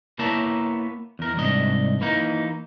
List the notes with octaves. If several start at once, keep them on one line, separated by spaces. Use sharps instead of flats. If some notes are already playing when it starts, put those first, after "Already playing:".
A#3 B3 E4 C#5 A5 A#5
E2 A#4
C2 G#2 D4 D#5
E3 A#3 D#4